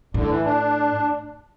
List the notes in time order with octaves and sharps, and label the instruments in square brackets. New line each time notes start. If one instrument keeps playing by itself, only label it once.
[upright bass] A2 [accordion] D3
[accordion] E3
D4